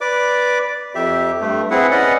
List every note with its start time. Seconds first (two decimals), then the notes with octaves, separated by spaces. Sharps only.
0.01 B4 D5 D6
0.95 F2 G4 E5
1.41 G2 A3
1.71 C4 E4 G#4 B4 F#5
1.91 C#4 B4 D5 D#5 F#5